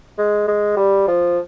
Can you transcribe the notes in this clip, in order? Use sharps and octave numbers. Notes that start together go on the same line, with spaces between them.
G#3
G#3
G3
F3